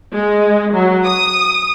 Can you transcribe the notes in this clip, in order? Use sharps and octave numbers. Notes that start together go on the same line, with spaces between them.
G#3
F#3
D#6